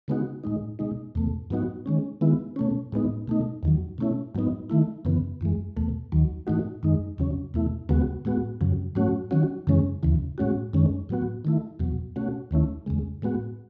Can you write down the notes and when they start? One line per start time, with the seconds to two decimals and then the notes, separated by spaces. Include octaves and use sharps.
0.08 C#3 G#3 B3 D#4 F#4
0.44 A2 G#3 D#4
0.79 B2 G#3 D#4
1.15 E2 B2 A3
1.50 G#2 F#3 B3 D#4 F#4
1.86 D#3 G#3 C#4
2.21 D#3 G#3 B3 E4
2.56 B2 A3 C#4
2.92 A2 G#3 B3 D#4
3.28 B2 A3 D#4
3.63 E2 D#3 F#3
3.98 B2 A3 C#4 E4
4.35 G#2 F#3 B3 D#4
4.70 D#3 A3 E4
5.05 F#2 C#3 E3 B3
5.41 F#2 E3 G#3
5.77 E2 B2 A3
6.12 D#2 D#3 F#3
6.47 G#2 E3 A3 D#4 F#4
6.83 F#2 D#3 G#3 D#4
7.18 E2 C#3 F#3 C#4
7.54 E2 B2 A3 E4
7.89 D#2 C#3 G#3 B3 F#4
8.25 A2 G#3 B3 F#4
8.61 F#2 C#3 F#3
8.95 G#2 F#3 A3 C#4 F#4
9.31 D#3 F#3 C#4 F#4
9.67 F#2 C#3 E3 G#3 C#4
10.03 D#2 C#3 E3
10.38 A2 G#3 C#4 F#4
10.73 F#2 D#3 G#3 C#4
11.09 A2 F#3 B3 F#4
11.45 D#3 A3 E4
11.79 E2 B2 F#3
12.16 B2 A3 C#4 F#4
12.51 D#2 D#3 A3 C#4 E4
12.86 E2 C#3 G#3
13.22 A2 G#3 B3 F#4